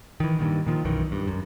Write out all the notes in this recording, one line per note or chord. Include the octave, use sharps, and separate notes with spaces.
D#3 E3
G2 A#2 D#3
A#2 D#3 F3
B1 F#2 D#3 E3
G2
F#2